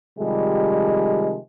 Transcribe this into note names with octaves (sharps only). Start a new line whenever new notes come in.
C3 D#3 F3 G3 G#3